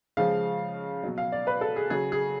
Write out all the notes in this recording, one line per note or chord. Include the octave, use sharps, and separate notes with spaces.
C#3 F3 G#3 F5
B2 F#3
F5
D5
B4
A4
G#4
C#3 F#3 G#4
G#4